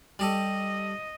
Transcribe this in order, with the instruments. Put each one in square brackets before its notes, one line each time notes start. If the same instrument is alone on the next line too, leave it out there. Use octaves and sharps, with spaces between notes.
[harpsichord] G3 G4 A4 [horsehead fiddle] D#5